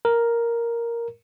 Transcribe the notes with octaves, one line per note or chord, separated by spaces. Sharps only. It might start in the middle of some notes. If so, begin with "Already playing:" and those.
A#4